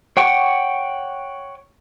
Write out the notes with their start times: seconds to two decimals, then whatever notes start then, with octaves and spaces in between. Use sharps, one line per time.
0.17 C#5 F#5 G5 C#6 D6